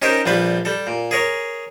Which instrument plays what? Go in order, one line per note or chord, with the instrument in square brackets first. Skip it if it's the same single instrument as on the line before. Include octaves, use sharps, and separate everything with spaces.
[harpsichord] C#4 D#4 G4 A#4 C5
A#1 G3 F4 B4
G3 A4
A#2
G#4 A#4 C#5